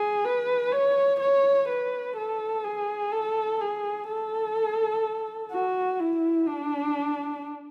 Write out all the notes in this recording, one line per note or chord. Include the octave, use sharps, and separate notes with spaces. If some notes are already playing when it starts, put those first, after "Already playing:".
Already playing: G#4
B4
C#5
C#5
B4
A4
G#4
A4
G#4
A4
F#4
E4
D4